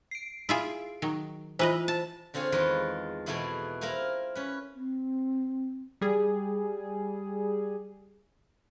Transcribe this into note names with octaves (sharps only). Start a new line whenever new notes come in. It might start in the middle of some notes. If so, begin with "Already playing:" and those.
C7 D7
E4 F4 G#4
D#3 F#3
E3 F4 B4 C5 D#5
A5
D3 C4 F4 G#4 C#5
E2 D#3 G#3 F4 B4 D#5
B2 E3 A3 B3 E4 G#4
E4 A#4 C5 F5 G#5
C#4 B4
C4
G3 G#4